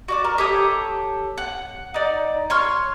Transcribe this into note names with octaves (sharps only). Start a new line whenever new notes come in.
F#4 D5 D6
A#4
G4 A4 C#5 D#6
F#5
D#4 D5
C#5 C6 C#6 F6